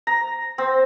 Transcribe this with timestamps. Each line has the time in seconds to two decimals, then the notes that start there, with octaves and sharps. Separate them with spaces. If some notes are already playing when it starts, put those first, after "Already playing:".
0.07 A#5
0.58 C4